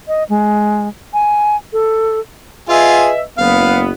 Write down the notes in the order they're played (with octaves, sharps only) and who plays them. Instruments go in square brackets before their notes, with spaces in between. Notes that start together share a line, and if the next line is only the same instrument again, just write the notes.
[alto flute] D#5
G#3
G#5
A4
[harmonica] F4 G#4 G#5 [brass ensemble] B4 D#5 E5
[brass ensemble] F#1 B3 [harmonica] F5